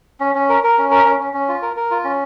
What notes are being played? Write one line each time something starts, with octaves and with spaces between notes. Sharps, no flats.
C#4
C#4
A#4
A#4
C#4
A#4
C#4
C#4
C#4
F4
A#4
A#4
F4
C#4